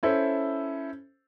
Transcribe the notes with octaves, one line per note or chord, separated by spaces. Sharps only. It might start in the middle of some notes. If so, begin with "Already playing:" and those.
C#4 E4 A4 C5